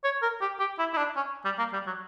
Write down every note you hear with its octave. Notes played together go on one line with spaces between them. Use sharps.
C#5
A#4
G4
G4
E4
E4
D4
C#4
G3
A#3
G3
F#3